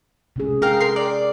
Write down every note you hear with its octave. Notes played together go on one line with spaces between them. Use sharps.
C3 C#4 G#4
G#4 A#4 F5 G5
A#4 C6
D5